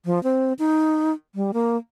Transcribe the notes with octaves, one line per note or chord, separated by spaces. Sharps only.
F3
C4
D#4
G3
A#3